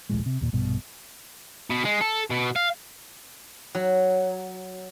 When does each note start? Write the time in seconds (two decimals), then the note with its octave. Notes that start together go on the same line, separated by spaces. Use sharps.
0.10 D#1 A#1 A2 G#3
0.26 C3
0.41 D#2 A#2
0.53 A#1 G2 B2
1.71 B2
1.85 G#3
2.01 A4
2.31 B2
2.56 F5
3.75 F#3